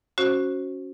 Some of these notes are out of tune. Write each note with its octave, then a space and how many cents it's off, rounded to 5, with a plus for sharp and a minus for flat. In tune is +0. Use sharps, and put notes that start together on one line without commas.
C#4 +0 F#4 +0 C5 +15